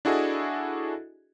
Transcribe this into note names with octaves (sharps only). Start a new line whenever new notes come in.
D4 E4 F#4 G#4 A4 D#5